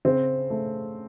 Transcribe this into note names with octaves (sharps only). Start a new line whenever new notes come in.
C#3 C4
A3